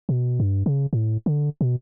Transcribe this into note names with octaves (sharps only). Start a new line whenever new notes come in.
B2
G2
C#3
A2
D3
B2